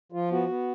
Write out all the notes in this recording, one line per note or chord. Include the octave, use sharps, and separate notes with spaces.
F3 F4
B3 F#4
B3